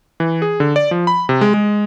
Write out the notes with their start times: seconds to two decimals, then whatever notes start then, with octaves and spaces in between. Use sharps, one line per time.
0.20 E3
0.42 G#4
0.60 D3
0.76 D5
0.91 F3
1.07 B5
1.29 C3
1.41 G#3
1.54 G#3